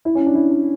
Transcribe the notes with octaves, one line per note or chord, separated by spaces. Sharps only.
E4
C#4
D4
E4
D4